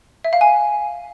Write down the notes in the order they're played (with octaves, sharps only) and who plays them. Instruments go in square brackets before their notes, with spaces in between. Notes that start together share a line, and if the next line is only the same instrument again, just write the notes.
[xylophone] E5
F5
G#5